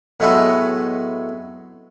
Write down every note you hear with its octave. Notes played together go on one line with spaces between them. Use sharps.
A2 F#3 G#3 A3 B3 F#4